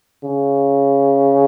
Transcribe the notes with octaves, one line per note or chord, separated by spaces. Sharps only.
C#3